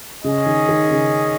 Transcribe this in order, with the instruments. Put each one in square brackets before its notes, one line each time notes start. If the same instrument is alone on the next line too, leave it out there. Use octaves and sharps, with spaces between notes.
[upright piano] C#3 [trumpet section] C#4 G#4 D#5
[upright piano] D#3
D#3
C#3